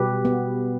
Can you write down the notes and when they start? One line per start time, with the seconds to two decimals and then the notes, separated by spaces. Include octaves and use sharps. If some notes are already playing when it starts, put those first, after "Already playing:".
Already playing: B2 G3 G4 B4
0.25 B3